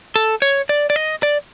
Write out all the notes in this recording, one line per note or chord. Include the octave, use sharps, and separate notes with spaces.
A4
C#5
D5
D5
D#5
D5